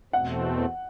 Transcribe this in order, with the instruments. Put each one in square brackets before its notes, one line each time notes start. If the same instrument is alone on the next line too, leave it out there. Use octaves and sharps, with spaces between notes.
[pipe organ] E2 B2 A3 C4 [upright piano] F#5